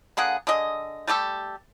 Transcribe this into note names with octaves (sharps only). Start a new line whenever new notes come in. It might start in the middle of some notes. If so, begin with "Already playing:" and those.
D3 A#3 G#4 F#5
D3 G#4 D#5
G3 A3 G4 A4